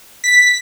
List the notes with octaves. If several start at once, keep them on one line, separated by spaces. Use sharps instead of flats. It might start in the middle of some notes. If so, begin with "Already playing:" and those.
B6